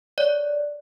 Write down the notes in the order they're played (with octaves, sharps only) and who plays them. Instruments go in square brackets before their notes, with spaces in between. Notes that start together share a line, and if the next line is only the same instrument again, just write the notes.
[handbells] C#5 D5